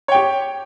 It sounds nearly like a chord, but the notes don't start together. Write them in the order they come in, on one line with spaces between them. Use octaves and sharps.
C#5 G5 G4